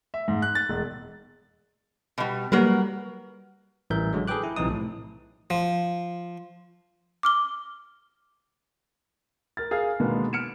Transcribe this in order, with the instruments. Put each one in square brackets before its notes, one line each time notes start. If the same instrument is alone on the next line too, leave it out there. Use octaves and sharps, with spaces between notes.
[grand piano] E5
G#2
F#6
A6
E1
[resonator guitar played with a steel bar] B2 G3
[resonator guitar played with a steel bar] F#3 A#4 B4 [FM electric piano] G3 A#3
[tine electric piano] A1 E3 G3 A#4 E5 G6
D3 F#3 G#3
G#4 A4 B4 G5 D6 F#6
E4
B1 C3 E3 F3 D#4 D#6
A2
[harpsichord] F3
[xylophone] D6 F6 G7
[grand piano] A#4 F6 A6
G#4 A#4 F5 G#5 F6
B2 D3 D#3 G#3 A#3 B3
F6 C#7 D7 E7